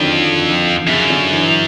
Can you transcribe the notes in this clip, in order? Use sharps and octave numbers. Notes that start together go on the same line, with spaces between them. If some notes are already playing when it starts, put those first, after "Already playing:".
Already playing: F2 D3 D#3 F3 F#3
F#2 C#3
D3
E3